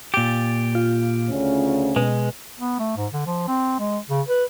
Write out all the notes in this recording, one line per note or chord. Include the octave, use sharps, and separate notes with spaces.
A#2 G4 A6
F4
D2 C#3 C#4
B2 G#3
B3
A3
G#2
D3
F3
C4
G#3
C#3
B4